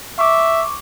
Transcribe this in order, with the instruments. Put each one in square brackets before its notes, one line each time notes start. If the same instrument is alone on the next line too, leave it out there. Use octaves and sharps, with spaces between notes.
[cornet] E5 [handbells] C#6 D6